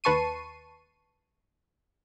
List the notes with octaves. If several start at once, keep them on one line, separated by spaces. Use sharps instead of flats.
D#2 B4 A5 C#6 C7 D#7